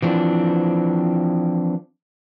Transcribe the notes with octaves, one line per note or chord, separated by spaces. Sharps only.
E3 F3 C4 D4